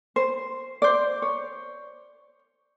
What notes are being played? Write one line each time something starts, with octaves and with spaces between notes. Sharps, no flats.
C5
C5 D5
C#5